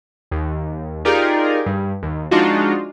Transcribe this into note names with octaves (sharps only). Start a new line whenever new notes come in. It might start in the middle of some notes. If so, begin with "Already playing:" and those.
D#2
D#4 F4 G4 G#4 A#4 D5
G2
D#2
F3 G#3 D4 D#4 F4 F#4